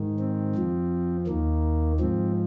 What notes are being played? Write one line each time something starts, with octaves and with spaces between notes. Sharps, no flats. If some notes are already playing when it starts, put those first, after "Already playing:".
Already playing: G#2 D#3
C4
F2 F3
D#2 D#3 A#3
G#2 F3 C4